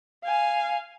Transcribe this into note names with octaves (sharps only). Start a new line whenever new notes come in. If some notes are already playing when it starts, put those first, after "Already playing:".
F5 G#5